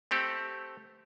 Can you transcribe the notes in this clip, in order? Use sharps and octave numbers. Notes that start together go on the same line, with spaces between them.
A3 C4 G4 A4